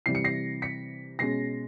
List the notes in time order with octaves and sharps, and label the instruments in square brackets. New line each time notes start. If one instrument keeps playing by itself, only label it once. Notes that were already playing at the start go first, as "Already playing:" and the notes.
[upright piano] C3 E3 G3 C7
C#7
A#6 C7
B6 C#7
B2 G#3 C#4 A#6 C7